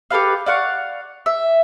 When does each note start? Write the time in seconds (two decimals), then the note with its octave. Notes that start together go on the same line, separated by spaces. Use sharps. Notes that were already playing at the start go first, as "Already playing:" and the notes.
0.11 G4 A4 B4 F5
0.46 D5 F5 F#5 C#6
1.26 E5